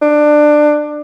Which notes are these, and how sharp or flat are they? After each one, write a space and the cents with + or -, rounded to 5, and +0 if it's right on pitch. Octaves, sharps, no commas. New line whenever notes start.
D4 +20